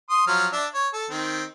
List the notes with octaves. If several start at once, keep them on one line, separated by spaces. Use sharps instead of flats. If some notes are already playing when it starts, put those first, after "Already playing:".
C6 D#6
F3 F#3 F6
D4 E5
C#5
A4
D#3 C4